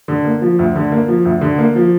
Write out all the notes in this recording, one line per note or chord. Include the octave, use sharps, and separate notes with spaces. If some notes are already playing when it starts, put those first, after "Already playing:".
D3
A#3
F3
D2
D3
A#3
F3
D2
D3
A#3
F3